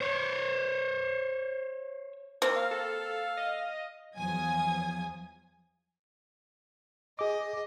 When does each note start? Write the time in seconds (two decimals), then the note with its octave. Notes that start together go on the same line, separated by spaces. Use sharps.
0.01 C5 C#5
2.42 A#3 C4
2.56 F5
2.71 A4
3.37 D#5
4.17 E2 F3 F#3 G#5 D#6 G#6
7.19 G#4 D#5 D6